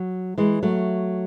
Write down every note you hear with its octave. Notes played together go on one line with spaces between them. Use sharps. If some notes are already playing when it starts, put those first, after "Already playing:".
Already playing: F#3
E3 G#3
F#3 A3